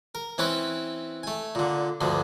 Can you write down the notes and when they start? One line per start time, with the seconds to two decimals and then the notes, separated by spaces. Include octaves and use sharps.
0.15 A#4
0.38 E3 C4 C#4 E4 B4
1.23 A3 G#5
1.55 A#2 D3
2.01 D2 G2 D3 F3